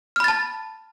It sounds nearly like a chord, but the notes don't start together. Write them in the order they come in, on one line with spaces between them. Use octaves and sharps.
F6 B5 A6 A5